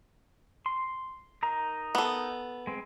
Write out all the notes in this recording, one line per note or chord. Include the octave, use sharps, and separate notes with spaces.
C6
D#4 A#4 A#5
B3 A4
G#3 C4